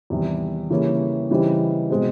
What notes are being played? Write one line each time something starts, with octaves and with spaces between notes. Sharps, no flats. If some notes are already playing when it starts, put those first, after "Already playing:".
E2 C3 D#3 G3
C#3 E3 G3 A#3 C#4
C#3 E3 G3 C4 D#4
B2 G#3 C4